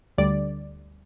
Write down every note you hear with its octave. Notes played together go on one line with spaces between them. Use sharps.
D2 D3 G3 D5